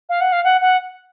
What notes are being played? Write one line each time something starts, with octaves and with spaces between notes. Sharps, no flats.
F5
F#5
F5
F#5
F#5